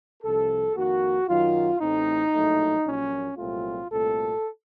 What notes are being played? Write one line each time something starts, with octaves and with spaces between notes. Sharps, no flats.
C2 C3 F3 A4
F2 D#3 A#3 F#4
F#2 D#3 F#3 F4
A1 A2 A3 C4 D#4
A#1 A2 F#3 A3
A#1 A#2 F#3 C#4
C2 A#2 F#3 A3 C4 F4
C2 A#2 A3 C4 A4